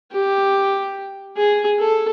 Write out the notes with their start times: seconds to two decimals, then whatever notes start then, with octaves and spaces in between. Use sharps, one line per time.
0.12 G4
1.37 G#4
1.79 A4